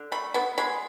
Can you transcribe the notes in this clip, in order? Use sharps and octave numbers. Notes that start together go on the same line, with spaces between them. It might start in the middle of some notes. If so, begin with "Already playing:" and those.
Already playing: D3
A3 B5
B3 B5
G#3 B5